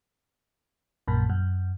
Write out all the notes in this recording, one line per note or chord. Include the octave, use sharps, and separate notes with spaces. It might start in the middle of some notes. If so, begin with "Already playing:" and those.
A#1 F#2 A#2
F#2